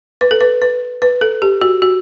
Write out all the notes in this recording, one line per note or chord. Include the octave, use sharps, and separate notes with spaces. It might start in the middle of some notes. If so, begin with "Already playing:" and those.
B4
A4
B4
B4
B4
A4
G4
F#4
F#4